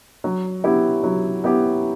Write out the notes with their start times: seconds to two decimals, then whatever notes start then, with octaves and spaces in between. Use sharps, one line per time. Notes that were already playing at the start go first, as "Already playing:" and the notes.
0.24 F#3
0.64 B3 E4 G4
1.04 F#3
1.44 B3 E4 G4